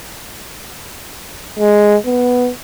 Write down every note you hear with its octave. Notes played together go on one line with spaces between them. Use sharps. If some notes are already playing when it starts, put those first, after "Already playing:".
G#3
B3